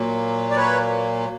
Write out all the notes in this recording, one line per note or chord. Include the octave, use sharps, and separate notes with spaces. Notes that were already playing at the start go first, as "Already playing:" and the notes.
Already playing: A#2 F#3 A#3
D5
B4 C#5